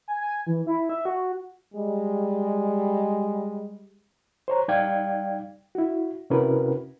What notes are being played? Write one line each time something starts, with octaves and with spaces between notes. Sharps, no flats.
G#5
G#5
E3
E4
E5
F#4
G3 G#3
C5 C#5 A#5
G3 D#4 D5 F5 G5 G#6
E4 F#4
C3 C#4 E4 F#4 A#4 B4